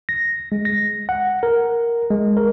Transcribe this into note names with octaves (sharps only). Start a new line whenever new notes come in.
A#6
G#3
A#6
F#5
A#4
G#3
A#4